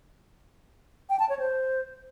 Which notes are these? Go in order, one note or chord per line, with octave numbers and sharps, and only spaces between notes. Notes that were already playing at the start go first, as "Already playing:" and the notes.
G5
A5
C#5
C5